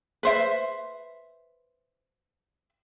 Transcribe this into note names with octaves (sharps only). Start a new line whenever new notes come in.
B4 C5 E5